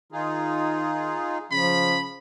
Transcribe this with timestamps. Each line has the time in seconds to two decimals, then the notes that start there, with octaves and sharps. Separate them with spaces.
0.12 D#3 D#4 F4 G#4
1.52 C#3 F3 B5